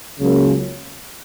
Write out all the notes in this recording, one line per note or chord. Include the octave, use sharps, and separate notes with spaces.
C#2 C#3 F#3 A#3 C#4